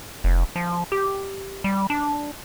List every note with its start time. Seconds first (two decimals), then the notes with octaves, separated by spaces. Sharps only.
0.24 F1
0.56 F3
0.92 G4
1.64 G3
1.90 D4